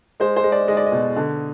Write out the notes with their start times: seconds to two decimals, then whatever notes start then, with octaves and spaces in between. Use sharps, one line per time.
0.20 G#3 C5
0.36 C5
0.44 G#3
0.52 D5
0.68 G#3 D#5
0.77 D5
0.86 D#5
0.92 B2
1.16 D3